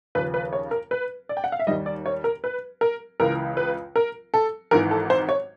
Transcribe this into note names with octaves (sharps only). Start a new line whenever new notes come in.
D#2 C#3 F3 B4
B4
C#5
A#4
B4
D5
G5
F#5
F5
E5
D#2 D#3 G3 D#5
D5
C#5
A#4
B4
A#4
C#2 C#3 E3 A#4
B4
A#4
A4
G#1 G#2 E3 A#4
A4
C5
C#5